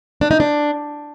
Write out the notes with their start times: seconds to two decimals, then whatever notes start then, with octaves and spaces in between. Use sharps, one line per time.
0.21 D4
0.31 D#4
0.40 D4